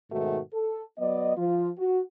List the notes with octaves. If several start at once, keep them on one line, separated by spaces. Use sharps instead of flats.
G#2 B2 D#3 A3 F#4
A4
F#3 B3 D5 D#5
F3 F4
F#4